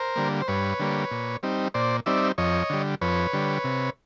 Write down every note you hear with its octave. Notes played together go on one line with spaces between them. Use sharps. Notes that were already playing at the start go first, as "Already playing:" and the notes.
Already playing: A#4 C5
D3 G3 A#3
C5
G2 B4 C#5
D3 G3 A#3
A#2
G3 C4 D#4
A#2 C5 D5
G3 C4 D#4 D5 E5
F2 C#5 D#5
D3 G3
F2 B4 C#5
D3 G3
C3